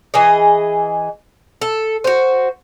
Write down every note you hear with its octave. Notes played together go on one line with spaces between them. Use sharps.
E3 G#4 D#5
A4
F#4 C5